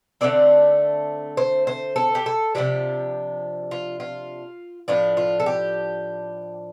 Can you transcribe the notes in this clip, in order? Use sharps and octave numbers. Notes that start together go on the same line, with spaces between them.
D3 A3 C4 D5
C5
C5
A4
G4
A4
C3 F3 D4 G4
F4
F4
A2 F3 D4 F4
F4
A4
G4